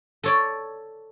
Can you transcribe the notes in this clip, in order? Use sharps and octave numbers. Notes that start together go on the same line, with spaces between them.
A4 C#5 D5